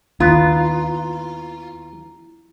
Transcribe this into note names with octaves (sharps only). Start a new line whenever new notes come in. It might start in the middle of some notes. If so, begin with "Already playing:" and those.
D#2 B3 E4 F4 A#5